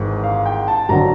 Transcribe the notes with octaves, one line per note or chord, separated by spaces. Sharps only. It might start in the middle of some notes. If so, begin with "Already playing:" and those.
Already playing: G#1 G#2 E3
F5
G5
A5
G#1 D3 F#3 A#5